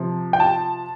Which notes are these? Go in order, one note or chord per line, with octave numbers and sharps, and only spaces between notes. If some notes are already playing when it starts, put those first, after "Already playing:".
Already playing: C3 F3
G5
A5